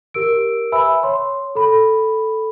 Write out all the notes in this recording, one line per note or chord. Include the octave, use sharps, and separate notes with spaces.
G4 A#4 E6 D7
B4 E5 G#5 B5 E6
C#5 C6
A4 B5